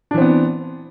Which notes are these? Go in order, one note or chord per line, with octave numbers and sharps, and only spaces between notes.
E3 B3 C4 D4